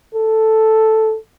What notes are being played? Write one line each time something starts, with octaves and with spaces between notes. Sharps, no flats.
A4